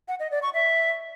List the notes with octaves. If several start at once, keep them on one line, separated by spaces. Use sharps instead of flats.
F#5
D#5
D5
C#6
E5